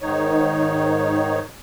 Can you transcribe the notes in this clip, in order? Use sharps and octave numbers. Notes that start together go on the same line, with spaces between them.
G#2 D#3 D#4 C#5